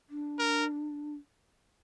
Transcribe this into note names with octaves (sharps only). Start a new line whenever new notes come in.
D4
A#4